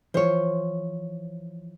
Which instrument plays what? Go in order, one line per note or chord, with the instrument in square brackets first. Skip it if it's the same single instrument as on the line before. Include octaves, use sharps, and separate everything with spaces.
[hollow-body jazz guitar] E3 F3 [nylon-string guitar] C5 C#5